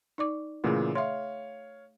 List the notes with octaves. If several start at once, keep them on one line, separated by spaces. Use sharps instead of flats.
D#4 D5 D6
A#2 C#3 E3 A3 G#4
C#5 E5 F5 C6